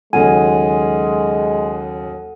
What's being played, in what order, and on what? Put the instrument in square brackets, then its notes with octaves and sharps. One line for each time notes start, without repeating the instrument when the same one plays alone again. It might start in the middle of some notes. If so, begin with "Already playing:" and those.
[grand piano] D#2 C#3 F#3 [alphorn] G#3 [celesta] A4 F#5 D#7 [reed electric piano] G#5